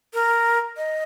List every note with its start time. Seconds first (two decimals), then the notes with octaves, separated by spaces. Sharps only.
0.14 A#4
0.77 D#5